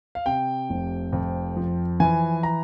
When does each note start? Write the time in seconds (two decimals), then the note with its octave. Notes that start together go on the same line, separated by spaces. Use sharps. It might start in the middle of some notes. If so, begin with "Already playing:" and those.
0.15 F5
0.26 C3 G5
0.70 F1
1.13 F2
1.57 F3
2.00 E3 G#5
2.43 A#5